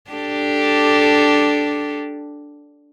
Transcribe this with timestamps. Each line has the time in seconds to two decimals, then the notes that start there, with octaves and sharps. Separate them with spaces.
0.11 D4 G4 A4